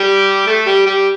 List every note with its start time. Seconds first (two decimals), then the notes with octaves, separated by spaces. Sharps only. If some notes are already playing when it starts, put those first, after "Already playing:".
Already playing: G3 G4
0.46 A3 A4
0.66 G3 G4
0.86 G3 G4